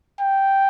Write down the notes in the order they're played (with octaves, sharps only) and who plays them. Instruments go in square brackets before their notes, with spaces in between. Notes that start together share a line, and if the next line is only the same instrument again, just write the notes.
[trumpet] G5